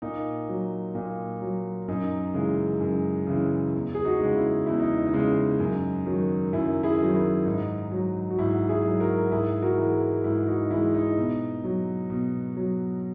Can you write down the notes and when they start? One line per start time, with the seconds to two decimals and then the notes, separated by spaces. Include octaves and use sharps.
0.02 A#2 D#4
0.49 F#3
0.95 A#2
1.41 F#3
1.88 F#2 D#4
2.34 C#3 E3 G#3
2.81 F#2
3.27 C#3 E3 G#3
3.74 E2
3.95 G#4
4.05 D#4 F#4
4.21 C#3 G#3
4.36 E4
4.66 E2 E4
4.80 D#4
5.06 D#4
5.13 C#3 G#3
5.60 F#2
6.06 D#3 F#3
6.53 F#2 E4
6.83 E4 G#4
6.99 D#3 F#3
7.15 E4
7.45 G#2 D#4
7.92 F#3
8.31 F#4
8.39 G#2 E4
8.69 E4 G#4
8.85 F#3
9.00 F#4 A#4
9.31 G#2 E4 G#4
9.62 F#4 A#4
9.78 E3 G#3
10.24 G#2 E4
10.47 D#4 F#4
10.71 E3 G#3 E4
10.94 D#4
11.17 B2
11.64 F#3
12.10 B2
12.57 F#3